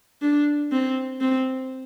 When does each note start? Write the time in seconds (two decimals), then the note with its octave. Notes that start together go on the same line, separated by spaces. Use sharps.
0.22 D4
0.72 C4
1.21 C4